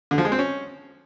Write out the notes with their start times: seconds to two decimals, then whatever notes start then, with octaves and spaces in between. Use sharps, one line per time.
0.11 D3
0.18 F3
0.25 G#3
0.32 C4
0.39 C#4